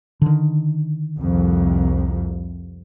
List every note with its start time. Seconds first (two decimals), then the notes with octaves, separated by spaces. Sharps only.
0.22 D3 D#3
1.19 C2 F2